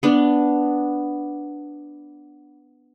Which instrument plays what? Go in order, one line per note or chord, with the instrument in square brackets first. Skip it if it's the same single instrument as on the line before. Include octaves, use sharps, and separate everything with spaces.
[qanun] B3 D4